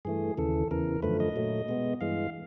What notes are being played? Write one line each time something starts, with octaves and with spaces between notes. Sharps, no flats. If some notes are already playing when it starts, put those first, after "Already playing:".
G2 E3 A3 G#4
D#2 C#3 E3 A4
E2 C#3 E3 A#4
F#2 D3 F3 A3 B4
D#5
A#2 F#3 A3
B2 G#3 B3
G2 E3 G#3 F5